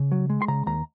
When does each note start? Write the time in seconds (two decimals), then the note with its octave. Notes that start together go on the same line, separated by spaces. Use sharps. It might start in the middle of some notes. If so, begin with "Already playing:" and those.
Already playing: C#3
0.12 F#3
0.30 G#3
0.42 C6
0.48 C#3 A#5
0.66 D#2 A#5